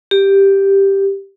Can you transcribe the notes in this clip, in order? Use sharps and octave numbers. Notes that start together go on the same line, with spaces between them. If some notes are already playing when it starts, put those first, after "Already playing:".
G4